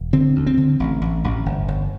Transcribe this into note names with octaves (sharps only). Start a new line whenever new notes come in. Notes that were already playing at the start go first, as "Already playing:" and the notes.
Already playing: E1
D3 C4
D2
C4
D3
A1
A1
A1
G1
G1